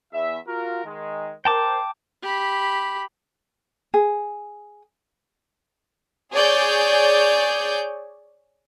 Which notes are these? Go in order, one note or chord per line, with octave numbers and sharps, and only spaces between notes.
E2 E5
F4 F#4 A#4
D#3 G#3
A#4 C5 G5 A5 D6
G4 B5
G#4
G#4 C#5 D5 G6